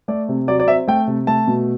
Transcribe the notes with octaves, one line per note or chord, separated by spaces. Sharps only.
A3 D5
C3
F#3 D5
D5
C4 E5
A3 G5
C3
A3 A5
B2